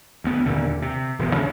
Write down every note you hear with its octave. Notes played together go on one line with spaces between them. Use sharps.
D2 B3
D#2 A#2 D3
C3
D#1 E2 B3
C#3